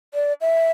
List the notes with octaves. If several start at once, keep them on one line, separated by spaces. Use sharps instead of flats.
D5
E5